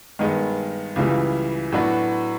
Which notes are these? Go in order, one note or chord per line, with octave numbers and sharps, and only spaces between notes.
G2 D#3 G#3 B3
C#2 C#3 E3 G3
A2 F#3 B3 D4 F#4